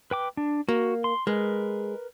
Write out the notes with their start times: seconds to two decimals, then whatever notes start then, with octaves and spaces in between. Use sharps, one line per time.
0.11 B4 G5 D6
0.37 D4
0.69 A#3 F#4
1.04 C6
1.27 G#3 A#4 B4